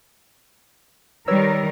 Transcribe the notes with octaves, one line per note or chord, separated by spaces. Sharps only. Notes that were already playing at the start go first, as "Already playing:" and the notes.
D#3 G3 A#4 B4 C#5 E6